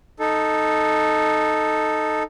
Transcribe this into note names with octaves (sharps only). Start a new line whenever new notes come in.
D#4 A4